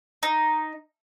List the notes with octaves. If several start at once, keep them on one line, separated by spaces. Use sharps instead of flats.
D#4